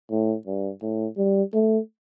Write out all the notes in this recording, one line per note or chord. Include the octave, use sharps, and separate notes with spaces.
A2
G2
A2
G3
A3